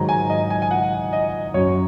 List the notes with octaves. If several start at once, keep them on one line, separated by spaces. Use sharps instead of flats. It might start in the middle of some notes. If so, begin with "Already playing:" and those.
Already playing: G#2 D#3 F#3 A#5
G#5
D#5
G#5
G#5
F#5
D#5
F#2 F#3 C#5